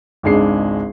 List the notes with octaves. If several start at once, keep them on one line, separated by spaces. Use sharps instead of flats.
G#1 C#2 G#3 D4 C7